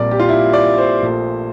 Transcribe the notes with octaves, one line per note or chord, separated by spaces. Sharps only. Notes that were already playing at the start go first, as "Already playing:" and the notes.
Already playing: A#1 A#2 G3 C4 A#4 D5
G4
F4
E4
D5
C5
A#1 A#2 A3